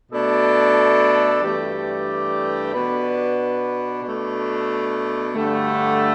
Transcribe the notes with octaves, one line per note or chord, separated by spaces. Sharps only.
B2 A3 D4 A4 D5
G2 E3 A3 G4 D5
B2 B3 D4 B4 D5
B2 A3 D4
G2 D3 A3